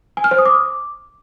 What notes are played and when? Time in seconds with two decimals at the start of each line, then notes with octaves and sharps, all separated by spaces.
0.17 G#5
0.24 F6
0.31 C5
0.38 D#6
0.45 D6